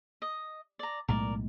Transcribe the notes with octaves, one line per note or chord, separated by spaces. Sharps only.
D#5
D5 A#5
B1 A2 G#3 A#4 D5